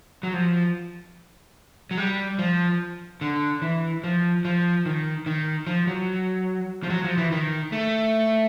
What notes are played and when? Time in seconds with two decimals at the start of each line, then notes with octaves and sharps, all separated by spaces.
0.23 F#3
0.33 F3
1.91 F#3
1.97 G3
2.39 F3
3.21 D3
3.62 E3
4.04 F3
4.45 F3
4.86 D#3
5.26 D#3
5.67 F3
5.87 F#3
6.83 F3
6.90 F#3
7.04 F3
7.17 E3
7.32 D#3
7.72 A3